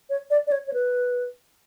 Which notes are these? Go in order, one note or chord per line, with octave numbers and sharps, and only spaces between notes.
C#5
D5
D5
C#5
C#5
B4